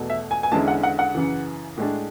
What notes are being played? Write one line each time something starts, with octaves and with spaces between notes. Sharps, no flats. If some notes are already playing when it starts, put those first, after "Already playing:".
Already playing: E2 B2 A3
E5
G#5
G#5
E2 D3 G#3 C#4 E4 A5
F#5
F#5
F#5
F#2 C#3 E3
A2 G#3 D4